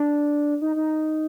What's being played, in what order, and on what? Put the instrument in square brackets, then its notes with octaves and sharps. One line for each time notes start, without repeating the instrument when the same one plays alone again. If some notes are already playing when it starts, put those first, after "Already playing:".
Already playing: [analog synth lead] D4
D#4
D#4